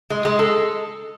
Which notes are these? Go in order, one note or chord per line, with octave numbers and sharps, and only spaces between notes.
G#3
G#3
A4